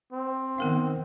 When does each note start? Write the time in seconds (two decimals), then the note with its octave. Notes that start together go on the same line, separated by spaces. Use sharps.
0.13 C4
0.58 D#3 B3 A#4 F5